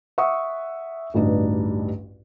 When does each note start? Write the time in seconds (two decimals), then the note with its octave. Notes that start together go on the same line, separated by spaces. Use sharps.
0.18 E5 F#5 C#6 D#6 E6
1.14 A1 D2 G2 D4 D#4 B4